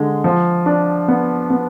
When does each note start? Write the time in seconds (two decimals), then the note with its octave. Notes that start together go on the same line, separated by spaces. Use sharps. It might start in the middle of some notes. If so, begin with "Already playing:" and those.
Already playing: D3 G#3
0.24 F3
0.66 D4
1.08 B3
1.50 B3